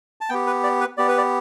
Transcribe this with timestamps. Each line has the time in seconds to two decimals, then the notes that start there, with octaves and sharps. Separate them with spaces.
0.21 A5
0.29 B3 G4 G5
0.47 B4
0.64 D5
0.81 B4
0.97 B3 G4 D5
1.08 B4
1.18 D5